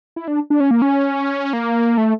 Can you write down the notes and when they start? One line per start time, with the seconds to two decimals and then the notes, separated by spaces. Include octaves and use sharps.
0.16 E4
0.28 D4
0.50 D4
0.60 C#4
0.71 A#3
0.82 C#4
1.53 A#3
1.98 A3